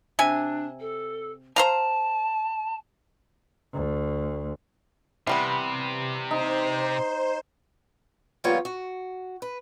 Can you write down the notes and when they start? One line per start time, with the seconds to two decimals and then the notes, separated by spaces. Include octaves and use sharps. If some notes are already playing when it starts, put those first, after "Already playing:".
0.19 C3 D4 G#5
0.79 A4
1.56 C5 F5 A5 A#5
3.73 D2
5.27 C3 E3 G3 B3
6.31 D#4 C5
8.44 F3 G3 A#3 B3 F4 C#5
8.65 F#4
9.42 B4